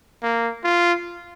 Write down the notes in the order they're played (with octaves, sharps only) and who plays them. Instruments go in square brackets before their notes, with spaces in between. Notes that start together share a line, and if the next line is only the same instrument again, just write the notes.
[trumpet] A#3
F4